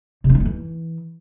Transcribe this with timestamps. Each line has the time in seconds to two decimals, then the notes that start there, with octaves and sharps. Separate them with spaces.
0.24 C3
0.29 C#4
0.35 G#3
0.40 A#3
0.45 E3